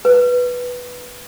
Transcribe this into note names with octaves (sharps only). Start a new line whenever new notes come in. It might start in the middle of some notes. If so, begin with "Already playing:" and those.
B4